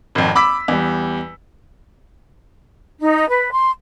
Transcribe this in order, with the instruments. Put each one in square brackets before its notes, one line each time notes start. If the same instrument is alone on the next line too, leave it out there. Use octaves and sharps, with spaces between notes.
[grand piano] G#1 F2
B5 D6 E6 B6
E2 G3
[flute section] D#4
B4
C6